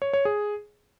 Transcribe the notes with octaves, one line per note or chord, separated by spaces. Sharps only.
C#5
C#5
G#4